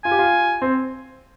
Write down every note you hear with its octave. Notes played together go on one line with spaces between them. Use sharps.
F4 G#5
G4
F4
C4